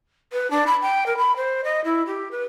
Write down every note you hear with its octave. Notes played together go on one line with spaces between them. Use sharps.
B4
D4
B5
G5
A#4
B5
C5
D#5
E4
G4
B4